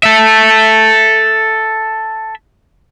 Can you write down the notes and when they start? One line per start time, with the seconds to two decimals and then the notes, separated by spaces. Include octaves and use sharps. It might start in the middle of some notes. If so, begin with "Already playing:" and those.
0.03 A4 E5